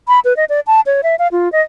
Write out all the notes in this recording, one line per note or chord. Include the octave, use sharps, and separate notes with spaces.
B5
B4
D#5
D5
A5
C#5
E5
F5
F4
D#5